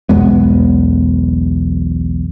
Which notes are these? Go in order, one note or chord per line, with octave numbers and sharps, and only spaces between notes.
B1 E2 G#3 B3